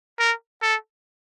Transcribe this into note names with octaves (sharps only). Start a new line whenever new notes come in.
A#4
A4